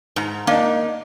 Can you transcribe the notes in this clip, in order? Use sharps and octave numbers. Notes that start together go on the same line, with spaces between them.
G#2 A#5
A#3 D4 D#4